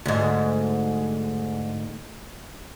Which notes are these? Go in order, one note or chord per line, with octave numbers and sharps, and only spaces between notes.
D2 G#2